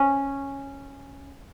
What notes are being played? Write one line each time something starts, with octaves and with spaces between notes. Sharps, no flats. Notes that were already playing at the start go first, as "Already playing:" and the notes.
Already playing: C#4